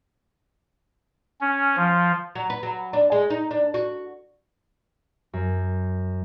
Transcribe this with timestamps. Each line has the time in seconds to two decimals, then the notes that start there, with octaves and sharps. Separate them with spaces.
1.41 C#4
1.77 F3
2.35 F#3
2.50 B4
2.63 F#3
2.93 D4
3.12 G#3
3.30 D#4
3.51 D4
3.74 F#4
5.33 F#2